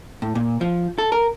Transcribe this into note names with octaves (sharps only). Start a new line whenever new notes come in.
A2
A#2
F3
A4
A#4